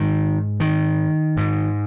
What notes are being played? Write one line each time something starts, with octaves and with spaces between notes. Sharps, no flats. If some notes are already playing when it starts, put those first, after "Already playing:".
Already playing: G#2 D#3
D#3
G#2